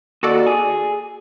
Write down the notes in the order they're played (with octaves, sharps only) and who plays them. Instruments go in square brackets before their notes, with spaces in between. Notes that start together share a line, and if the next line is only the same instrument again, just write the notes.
[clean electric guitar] D#2 [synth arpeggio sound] F#4 A4 D5
[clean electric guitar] G#4